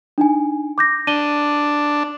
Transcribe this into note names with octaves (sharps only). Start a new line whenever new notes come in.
D4 D#4 G#5
D6 G6 A#6
D4 D#7 G7